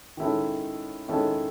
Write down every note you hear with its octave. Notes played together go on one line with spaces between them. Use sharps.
D#3 G#3 C#4 E4 A4
D#3 G#3 C#4 E4 A4